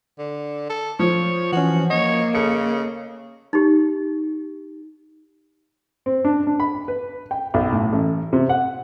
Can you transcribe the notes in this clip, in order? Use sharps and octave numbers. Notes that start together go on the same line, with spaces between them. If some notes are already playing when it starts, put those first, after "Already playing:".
D3
A4
F3 C#5
E3 C#4 F#4
A#3 C#5 D#5
C#3 A4 C#7
D#4 G4
C4
D4
D4
B5
B4
G5
B1
A2
A1
C3
F#5